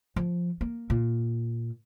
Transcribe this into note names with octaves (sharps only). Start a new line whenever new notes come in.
F3
A#3
A#2